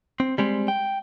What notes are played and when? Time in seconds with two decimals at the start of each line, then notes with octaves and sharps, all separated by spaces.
0.20 C4
0.38 G3 G#3 C4
0.68 G5